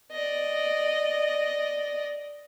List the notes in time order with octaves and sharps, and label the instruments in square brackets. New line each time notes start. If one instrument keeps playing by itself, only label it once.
[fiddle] D5 D#5